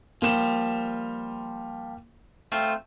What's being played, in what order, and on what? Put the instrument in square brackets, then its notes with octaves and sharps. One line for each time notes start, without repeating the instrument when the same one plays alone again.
[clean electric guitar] F3 G3 [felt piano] A#3 E7
[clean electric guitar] A3 C4 F4